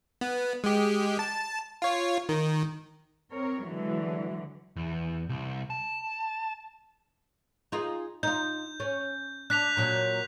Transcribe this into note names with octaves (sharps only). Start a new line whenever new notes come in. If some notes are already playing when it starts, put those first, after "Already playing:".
B3
G#3 G4
A5
F4 C#5
D#3
C4 A#4 C#5
D3 E3 F#3 G#3
E2
C2
A5
D#4 F4 G#4
D#4 F4 G6
C#4
D4 F#6 B6 F7
A#2 F#3